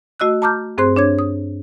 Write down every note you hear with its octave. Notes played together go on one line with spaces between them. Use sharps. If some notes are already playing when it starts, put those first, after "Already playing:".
A3 F#4 D#5 E6 F#6
A5 A#5 D6 F6 G6
G2 C4 G#4 C5 C6 F#6
D4 C#5 D6 G#6
D#6